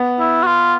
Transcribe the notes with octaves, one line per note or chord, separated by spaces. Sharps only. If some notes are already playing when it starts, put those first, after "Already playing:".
Already playing: B3
E4
F#4
F4